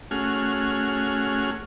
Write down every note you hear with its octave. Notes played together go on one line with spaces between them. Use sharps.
A3 C#4 F#4 G#4 F6